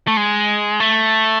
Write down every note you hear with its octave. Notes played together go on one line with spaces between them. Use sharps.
A3
G#3
A3